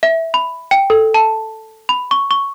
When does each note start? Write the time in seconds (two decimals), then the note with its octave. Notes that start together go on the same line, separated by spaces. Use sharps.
0.03 E5
0.34 B5
0.71 G5
0.90 A4
1.14 A5
1.89 B5
2.11 C#6
2.31 C#6